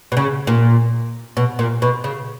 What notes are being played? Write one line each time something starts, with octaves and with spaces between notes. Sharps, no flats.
B2
C#3
A#2
B2
A#2
B2
C#3